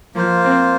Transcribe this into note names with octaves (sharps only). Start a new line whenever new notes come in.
F3 A#3 F4 C5
C4